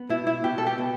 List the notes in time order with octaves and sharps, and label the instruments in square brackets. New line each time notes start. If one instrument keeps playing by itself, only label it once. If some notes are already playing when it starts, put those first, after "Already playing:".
Already playing: [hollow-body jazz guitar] B3
[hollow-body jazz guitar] B2 [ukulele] E4
[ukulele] E4
[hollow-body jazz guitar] B2 [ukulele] G4
[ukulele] A4
G4
[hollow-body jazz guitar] B2